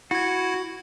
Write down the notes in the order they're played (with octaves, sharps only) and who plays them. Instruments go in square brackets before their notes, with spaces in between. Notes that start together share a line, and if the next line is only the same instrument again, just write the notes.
[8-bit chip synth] E4 G#6 [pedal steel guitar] F#4